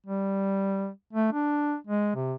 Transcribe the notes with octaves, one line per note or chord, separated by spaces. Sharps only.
G3
A3
D4
G#3
C3